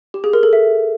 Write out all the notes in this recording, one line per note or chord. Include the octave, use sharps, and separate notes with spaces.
G4
G#4
A#4
A4
E5